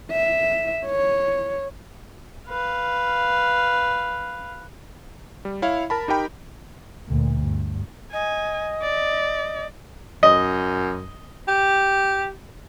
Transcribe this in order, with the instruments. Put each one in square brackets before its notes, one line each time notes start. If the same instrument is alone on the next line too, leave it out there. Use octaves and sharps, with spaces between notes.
[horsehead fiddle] E5
C#5
[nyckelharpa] B4 F5
[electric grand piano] G3
E4 C#5 F5
A#4 A5 B5
D#4 G4 A#4 G5 B5
[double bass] D2 A#2
G2
[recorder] D#5 [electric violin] G#5
[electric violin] D5
[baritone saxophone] F#2 [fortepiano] D#5
[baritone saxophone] G4